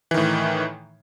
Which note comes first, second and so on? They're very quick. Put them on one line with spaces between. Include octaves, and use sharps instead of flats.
E3 D#3 A2